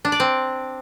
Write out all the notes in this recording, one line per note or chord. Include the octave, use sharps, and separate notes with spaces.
D4
D5
C4